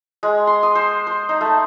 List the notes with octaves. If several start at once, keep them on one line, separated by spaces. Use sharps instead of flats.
G#3
C6
D#6
C5
C5
D#4
A3